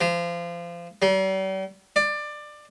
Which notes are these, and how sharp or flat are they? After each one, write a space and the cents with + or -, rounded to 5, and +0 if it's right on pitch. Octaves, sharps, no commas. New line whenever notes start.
F3 -25
G3 -45
D5 +20